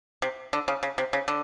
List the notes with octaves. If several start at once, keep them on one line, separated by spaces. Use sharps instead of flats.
C3
D3
C#3
C#3
C3
C#3
D3